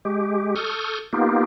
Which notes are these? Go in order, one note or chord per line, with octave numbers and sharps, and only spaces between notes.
G#3 G4
A4 C#6 D#6 F6 G6
A#3 B3 D#4 F4 G4